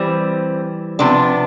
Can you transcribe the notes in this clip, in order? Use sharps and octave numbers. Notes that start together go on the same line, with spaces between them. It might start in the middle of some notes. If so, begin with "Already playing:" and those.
Already playing: E3 G3 C4
C3 F3 B3 D4